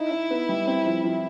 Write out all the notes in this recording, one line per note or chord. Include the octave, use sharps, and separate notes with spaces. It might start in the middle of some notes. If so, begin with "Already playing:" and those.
Already playing: D#4 E4
D#4
B3
G3
C4
F3
F3